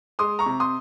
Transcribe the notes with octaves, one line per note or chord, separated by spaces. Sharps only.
G#3 C6 D#6
A#5 C#6
C3
C6 D#6